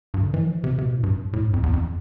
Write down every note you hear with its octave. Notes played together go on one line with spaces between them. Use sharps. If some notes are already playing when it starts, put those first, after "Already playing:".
G2
D3
E3
F3
E3
C3
C3
B2
A2
G2
F2
A2
G2
F2
E2
F2